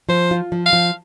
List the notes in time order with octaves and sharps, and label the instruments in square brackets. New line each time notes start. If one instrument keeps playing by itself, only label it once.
[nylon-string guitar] F3 [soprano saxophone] C5
[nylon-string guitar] F4
F3
[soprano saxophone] F5
[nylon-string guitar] F3